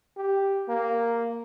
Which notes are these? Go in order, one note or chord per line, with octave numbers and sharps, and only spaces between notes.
G4
A#3